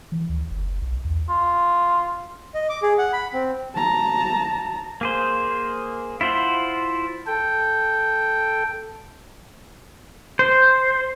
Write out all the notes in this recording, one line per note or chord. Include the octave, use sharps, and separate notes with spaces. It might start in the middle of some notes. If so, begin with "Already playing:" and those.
E3
D2
F#1
B1
E2
F4
D#5
D6
G#4
F#5
B5
C4
A5 A#5
A#3 G#4 C5
E4 F4 C5 F#5
A4 G5
C5